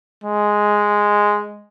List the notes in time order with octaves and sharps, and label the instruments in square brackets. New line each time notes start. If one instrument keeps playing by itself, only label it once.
[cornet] G#3